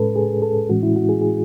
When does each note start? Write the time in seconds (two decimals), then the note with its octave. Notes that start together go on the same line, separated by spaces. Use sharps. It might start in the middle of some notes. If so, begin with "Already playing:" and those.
Already playing: A2 G#3 C#4 A4 B4
0.16 G#4
0.42 A4
0.69 A2 E3 G#3 C#4 F#4
0.83 E4
0.96 F#4
1.09 G#4
1.21 G#4